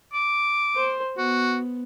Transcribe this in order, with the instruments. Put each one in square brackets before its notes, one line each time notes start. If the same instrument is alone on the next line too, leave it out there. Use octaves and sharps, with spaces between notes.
[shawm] D6
[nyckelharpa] C5
[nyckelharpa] B3 [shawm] F#4